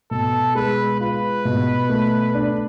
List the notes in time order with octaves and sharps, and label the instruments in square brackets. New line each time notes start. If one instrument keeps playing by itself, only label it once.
[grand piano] B2 [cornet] A4
[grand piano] G#3 [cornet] B4
[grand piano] F4 [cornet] B4
[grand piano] B2
A3
D4